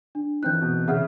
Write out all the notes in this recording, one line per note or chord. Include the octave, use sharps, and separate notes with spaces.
D4
E3 C4 D#4 F#6 G6
B2
C#3 E5 F#5 F6